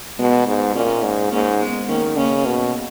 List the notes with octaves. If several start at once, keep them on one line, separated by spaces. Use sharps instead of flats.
B2 G#3 B3
G#2
A#2 A#3 C#4
G#2
G#2 A#3 C#4
G#3 B3
D#3 A#3 C#4
C#3 A#3 C#4
B2